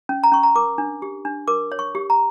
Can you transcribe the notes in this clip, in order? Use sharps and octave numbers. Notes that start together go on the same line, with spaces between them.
C#4
A#5
C#4 C#6
A#5
A#4 D6
D4
G4
D4
A#4 D6
C#5
C#6
G4
A#5